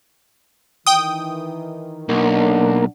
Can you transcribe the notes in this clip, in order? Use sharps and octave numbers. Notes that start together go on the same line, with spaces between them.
D#3 E3 G5 D#6
B1 A#3 D4 A#4 F#5 A#5